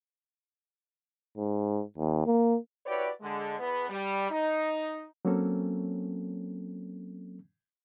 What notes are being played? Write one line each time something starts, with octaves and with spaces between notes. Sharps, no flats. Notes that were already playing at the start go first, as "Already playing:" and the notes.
G#2
D#2
A#3
E4 F#4 G4 B4 C#5 D5
D3 G#3
E2 B3 B4
G3
D#4
F#3 A#3 C4 C#4 A4